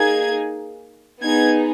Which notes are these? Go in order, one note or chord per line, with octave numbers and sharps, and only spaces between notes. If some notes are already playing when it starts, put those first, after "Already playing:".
Already playing: A#3 D#4 G#4 G#6
B3 D#4 G#4 G#6